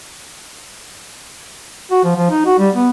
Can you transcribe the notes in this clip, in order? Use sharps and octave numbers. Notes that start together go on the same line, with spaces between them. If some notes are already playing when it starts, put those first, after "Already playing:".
F#4
F3
F3
D#4
F#4
G3
B3